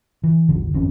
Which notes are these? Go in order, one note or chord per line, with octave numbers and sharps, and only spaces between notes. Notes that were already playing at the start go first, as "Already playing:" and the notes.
E3
D#1 G#1 F#2 D3
G#1 F2 C4 C#4